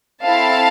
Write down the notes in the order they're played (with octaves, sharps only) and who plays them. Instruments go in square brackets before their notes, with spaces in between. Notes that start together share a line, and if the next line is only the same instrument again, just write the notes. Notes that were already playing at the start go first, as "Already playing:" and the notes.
[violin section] C4 E4 A4 F5 A5